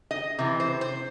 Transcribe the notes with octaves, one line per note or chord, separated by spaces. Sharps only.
D#5
C3 E3
C5
C5